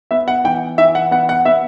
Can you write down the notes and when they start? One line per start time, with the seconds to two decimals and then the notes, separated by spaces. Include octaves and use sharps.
0.11 B3 E5
0.28 F#5
0.44 E3 G5
0.78 E3 E5
0.95 F#5
1.11 B3 F#5
1.29 F#5
1.45 B3 E5